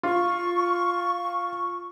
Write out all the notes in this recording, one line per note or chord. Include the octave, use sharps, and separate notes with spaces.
F4 C#6